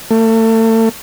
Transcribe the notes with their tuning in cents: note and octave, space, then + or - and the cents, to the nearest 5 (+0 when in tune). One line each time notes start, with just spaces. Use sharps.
A3 +35